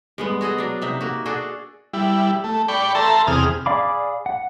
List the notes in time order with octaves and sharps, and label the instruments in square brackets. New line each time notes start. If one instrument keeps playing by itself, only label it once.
[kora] G2 G#3 B3
F#4 G#4 A4 D#5
F#3 D4
C3 D#4 E5
A#3 F#4
D4 F#4 G#4 A4
[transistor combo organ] G3 E4
A3
D5 G5 B5 C#6
A4 E5 A5 A#5 C6
E2 C3 G#4 D#6 F6
[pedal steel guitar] G#4 D5 F5 B5 D6
F#5